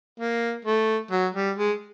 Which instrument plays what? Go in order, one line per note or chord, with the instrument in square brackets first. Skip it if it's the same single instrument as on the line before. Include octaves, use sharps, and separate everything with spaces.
[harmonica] A#3
A3
F#3
G3
G#3